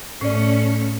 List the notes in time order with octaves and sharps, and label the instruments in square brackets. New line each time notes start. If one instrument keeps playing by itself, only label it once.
[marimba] A2 D5 [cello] A3 C#4